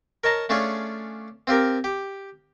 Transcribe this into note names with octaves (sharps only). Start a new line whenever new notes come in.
A#4 C#5 D#5 A5 A#5
A3 C#4 D4 F4 G#4 C#5
C4 F4 G4 A#4
G4